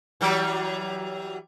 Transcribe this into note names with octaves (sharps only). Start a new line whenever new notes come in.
E3 F#3 G3